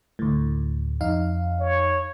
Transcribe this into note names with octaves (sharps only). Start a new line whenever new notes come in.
D2 A2
F2 D#4 F5
C#5